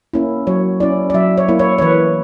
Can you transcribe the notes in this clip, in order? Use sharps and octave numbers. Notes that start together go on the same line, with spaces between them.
A#3 C#4 E4
F#3 C#5
C#4 E4 D5
D5
F#3 E5
C#5
A#3 E4
C#5
C#5
E3 B4